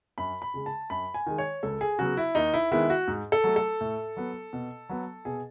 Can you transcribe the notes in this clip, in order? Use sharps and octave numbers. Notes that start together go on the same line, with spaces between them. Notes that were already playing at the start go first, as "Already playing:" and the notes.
F#2 B5
B5
C#3 G#3
A5
F#2 B5
G#5
D#3 G#3
C#5
C#2 A4
G#4
C#3 F#3 B3 F#4
E4
D#2 D#4
E4
D#3 G#3 B3 E4
F#4
G#2
A4
F#3 A3
A4
A2
F#3 B3
B2
F#3 B3
B2 G#4